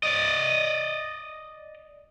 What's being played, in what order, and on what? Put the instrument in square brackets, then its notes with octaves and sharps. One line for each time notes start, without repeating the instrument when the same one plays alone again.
[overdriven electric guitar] D5 D#5